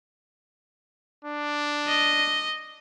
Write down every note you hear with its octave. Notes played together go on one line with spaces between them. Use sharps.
D4
D#5